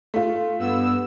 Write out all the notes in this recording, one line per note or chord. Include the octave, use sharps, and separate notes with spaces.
A3 F4
G2 B3 E6